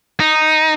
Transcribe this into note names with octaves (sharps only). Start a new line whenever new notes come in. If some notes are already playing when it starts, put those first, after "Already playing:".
D#4